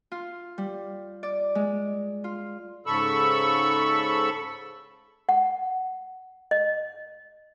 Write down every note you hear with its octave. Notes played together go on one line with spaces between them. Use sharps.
F4
G3
D5
G#3
F4
G#2 C#3 A4 B5 C#6 E6
F#5
D#5